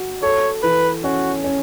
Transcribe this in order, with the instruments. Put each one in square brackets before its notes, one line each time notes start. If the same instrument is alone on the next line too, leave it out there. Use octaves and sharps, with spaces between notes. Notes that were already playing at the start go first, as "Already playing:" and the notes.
Already playing: [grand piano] F#4
[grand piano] A4 [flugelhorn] C#5
[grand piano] E3 [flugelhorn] B4
[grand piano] C#4 [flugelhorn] F#4
[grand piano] C#4